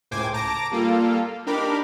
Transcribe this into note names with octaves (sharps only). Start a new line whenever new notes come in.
C#2 A2 C5 G5 G#5 D6
A5 A#5 D6 A#6 D7
G3 A#3 F4 A4
D4 D#4 G4 A#4 B5 D6